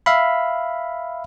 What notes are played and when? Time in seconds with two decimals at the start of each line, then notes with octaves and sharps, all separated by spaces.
0.06 E5 F5 B5